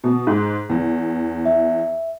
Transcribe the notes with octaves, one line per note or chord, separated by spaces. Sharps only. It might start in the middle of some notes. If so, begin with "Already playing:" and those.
B2
G#2
E2
E5